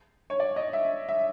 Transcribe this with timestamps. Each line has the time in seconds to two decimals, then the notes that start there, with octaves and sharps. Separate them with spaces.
0.30 C#5
0.40 D5
0.56 D#5
0.73 E5
1.09 E5